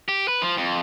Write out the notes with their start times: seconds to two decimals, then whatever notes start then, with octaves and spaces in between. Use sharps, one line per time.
0.08 G4
0.28 B4
0.42 F3
0.57 F2